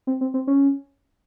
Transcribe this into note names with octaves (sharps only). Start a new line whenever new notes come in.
C4
C4
C4
C#4